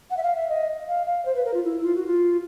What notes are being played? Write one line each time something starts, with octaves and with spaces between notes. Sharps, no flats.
F#5
E5
F5
E5
D#5
F5
F5
C5
B4
A#4
F4
E4
F4
F#4
F4